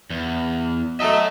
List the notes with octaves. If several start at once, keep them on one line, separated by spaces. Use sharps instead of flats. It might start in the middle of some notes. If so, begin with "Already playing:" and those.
E2
F#3 A3 D#5 E5 A5